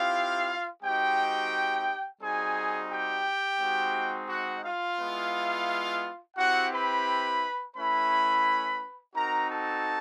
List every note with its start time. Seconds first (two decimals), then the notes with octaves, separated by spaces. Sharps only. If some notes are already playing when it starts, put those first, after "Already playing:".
Already playing: C4 E4 F4 G4 F5
0.82 G#3 C4 D#4 F#4 G4 G5
2.20 G3 C4 D#4 F#4 G#4 G#5
2.90 G4 G5
3.60 G#3 C4 D#4 F#4
4.29 F#4 F#5
4.64 F4 F5
4.98 G#3 B3 E4
6.36 C4 E4 F#4 G4 F#5
6.72 B4 B5
7.75 A3 C#4 E4 B4 B5
9.14 C4 D#4 F#4 A#4 A#5
9.48 A4 A5